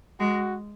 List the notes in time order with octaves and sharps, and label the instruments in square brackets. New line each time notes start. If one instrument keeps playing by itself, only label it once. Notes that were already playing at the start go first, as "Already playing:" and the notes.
[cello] G#3 [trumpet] F#4